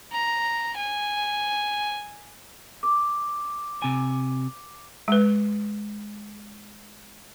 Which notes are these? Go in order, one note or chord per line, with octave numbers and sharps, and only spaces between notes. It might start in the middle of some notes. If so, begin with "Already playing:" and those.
A#5
G#5
D6
C3 G#5
G#3 B4